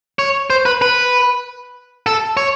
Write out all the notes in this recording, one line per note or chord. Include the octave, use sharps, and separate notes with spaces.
C#5
C5
B4
B4
A4
C#5